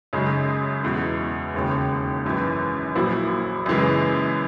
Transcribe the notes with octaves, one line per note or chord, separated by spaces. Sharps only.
F#2 C#3 G#3 D#4
E2 B2 G#3
E1 D#2 C#3
G#1 F#2 E3
A#1 A#2 F#3 A#3 E4
F#2 C#3 E3 G#3